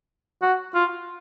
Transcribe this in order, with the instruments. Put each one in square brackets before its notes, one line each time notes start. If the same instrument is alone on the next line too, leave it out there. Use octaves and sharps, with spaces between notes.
[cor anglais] F#4
F4